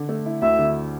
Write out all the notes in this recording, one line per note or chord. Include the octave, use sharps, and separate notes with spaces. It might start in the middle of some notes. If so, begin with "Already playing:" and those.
Already playing: D3
A3
E4
D2 E5
D3